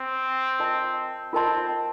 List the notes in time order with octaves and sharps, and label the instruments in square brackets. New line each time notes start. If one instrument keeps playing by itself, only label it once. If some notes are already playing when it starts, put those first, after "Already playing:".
Already playing: [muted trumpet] C4
[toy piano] F4 A#4 D#5 A5 C6
[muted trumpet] C4 [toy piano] F4 A#4 D#5 A5 C6